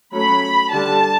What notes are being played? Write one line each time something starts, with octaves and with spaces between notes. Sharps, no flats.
F#3 A3 C#4 B5
D3 G3 D4 A5